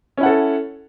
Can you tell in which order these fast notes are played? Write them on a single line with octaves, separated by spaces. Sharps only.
C#4 E4 F#5 A4